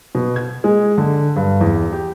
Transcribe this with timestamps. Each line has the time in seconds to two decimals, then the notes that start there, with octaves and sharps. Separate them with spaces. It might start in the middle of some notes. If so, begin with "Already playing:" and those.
0.15 B2
0.36 G#6
0.64 G#3
0.98 D3
1.36 G2
1.61 E2
1.93 G4